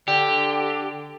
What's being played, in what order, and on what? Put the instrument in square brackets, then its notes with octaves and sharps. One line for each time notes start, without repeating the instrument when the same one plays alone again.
[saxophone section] D3 [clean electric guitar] G4